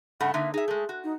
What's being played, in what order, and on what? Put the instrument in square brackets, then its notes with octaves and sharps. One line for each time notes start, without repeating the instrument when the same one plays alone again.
[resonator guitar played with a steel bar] G2 C#3 A3 [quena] F#5
[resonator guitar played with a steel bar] D3 A#3 D#4 [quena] E5
[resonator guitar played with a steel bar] D#4 E5 [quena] G#4
[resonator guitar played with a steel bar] G#3 A3
F#4
[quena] D#4